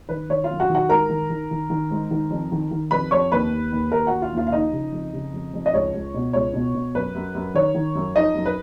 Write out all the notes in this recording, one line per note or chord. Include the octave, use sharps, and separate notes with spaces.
D#3 B4
D#3 C#5
F4 F5
F#2
F#4 F#5
D#3
F#4 F#5
G#2 A#4 A#5
D#3
D#3
D#3
D#3
G#2
D#3
F2
D#3
D#3
F2 B4 B5
F2 C#5 C#6
D#2 B4 B5
D#2
D#2
D#2 A#4 A#5
D#2 F#4 F#5
F4 F5
D#2 F4 F5
F5
F3 D#4 D#5
C#3
F2
C#3
F2
F2
D#5
C#2 C#5
C#2
B2
C#2 C#5
B2
B2
F#2 B4
F#2
F#2
D#3 C#5
D#3
F#2
F3 D#4 D#5
F#2
B4